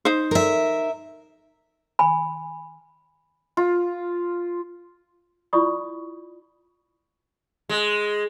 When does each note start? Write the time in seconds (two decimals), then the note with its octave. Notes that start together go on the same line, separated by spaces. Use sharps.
0.05 D#4 C5
0.31 A#4 E5
1.99 G#5 B5
3.57 F4
5.53 E4 F4 D5 B5 C#6 D#6
7.69 G#3